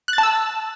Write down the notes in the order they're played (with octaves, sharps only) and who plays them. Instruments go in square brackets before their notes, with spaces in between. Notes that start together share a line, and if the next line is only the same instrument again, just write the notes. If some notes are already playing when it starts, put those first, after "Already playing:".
[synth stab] F#6
A6
A5
E6